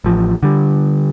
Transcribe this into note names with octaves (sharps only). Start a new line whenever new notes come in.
A1 F3
D3 G3